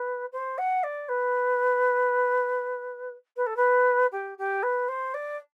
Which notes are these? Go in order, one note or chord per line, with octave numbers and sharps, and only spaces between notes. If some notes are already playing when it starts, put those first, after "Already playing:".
Already playing: B4
C5
F#5
D5
B4
B4
A4
B4
G4
G4
B4
C5
D5